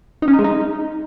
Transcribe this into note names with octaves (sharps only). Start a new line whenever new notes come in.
D#4
C#4
D#4
G#3
D#4